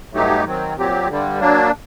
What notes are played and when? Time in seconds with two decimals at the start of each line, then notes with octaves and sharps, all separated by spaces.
0.13 G2 F#3 A3 D#4 G4
0.44 D#3 F#3 C4
0.76 A#2 F#3 C4 G4
1.08 G2 D3 G3
1.40 F#3 A#3 D4